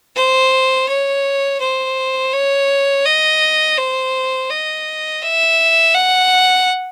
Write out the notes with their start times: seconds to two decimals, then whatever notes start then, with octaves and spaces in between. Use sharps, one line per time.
0.16 C5
0.88 C#5
1.60 C5
2.33 C#5
3.05 D#5
3.77 C5
4.50 D#5
5.22 E5
5.94 F#5